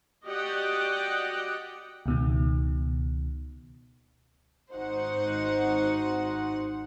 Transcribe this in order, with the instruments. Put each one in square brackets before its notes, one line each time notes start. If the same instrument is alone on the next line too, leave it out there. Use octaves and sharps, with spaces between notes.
[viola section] F#4 G4 D5 D#5 F#5 G5
[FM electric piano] C#2 B2 D#3
[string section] G#1 D#4 F#4 C5 F#5